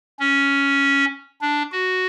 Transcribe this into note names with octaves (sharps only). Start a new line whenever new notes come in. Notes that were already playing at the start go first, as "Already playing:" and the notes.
C#4
D4
F#4